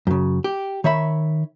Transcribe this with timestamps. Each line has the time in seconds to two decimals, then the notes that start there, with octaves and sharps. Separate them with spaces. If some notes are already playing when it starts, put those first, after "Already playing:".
0.07 F#2 C#3
0.44 G4
0.84 D#3 C#5 E5 B5